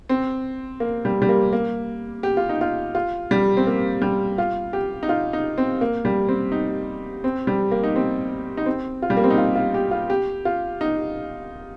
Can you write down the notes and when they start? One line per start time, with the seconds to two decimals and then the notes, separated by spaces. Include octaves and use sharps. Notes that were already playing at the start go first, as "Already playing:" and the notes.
0.09 C4
0.80 A#3
1.05 G3
1.22 G3
1.29 A#3
1.53 A#3
2.23 G4
2.37 F4
2.49 D#4
2.61 F4
2.95 F4
3.31 G3
3.57 C4
3.67 A#3
4.02 G3
4.38 F4
4.73 G4
5.03 D#4
5.09 F4
5.33 D#4
5.58 C4
5.81 A#3
6.05 G3
6.29 C4
6.52 D#4
7.24 C4
7.47 G3
7.71 A#3
7.84 D#4
7.96 C4
8.57 D#4
8.66 C4
9.02 F4
9.10 G3
9.17 A#3
9.24 C4
9.30 D#4
9.38 F4
9.55 F4
9.74 G4
9.91 F4
10.10 G4
10.45 F4
10.81 D#4